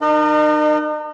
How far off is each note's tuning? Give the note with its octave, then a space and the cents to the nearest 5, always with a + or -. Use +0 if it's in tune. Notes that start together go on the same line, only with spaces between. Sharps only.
D#4 -45 A#4 +0 D#5 -35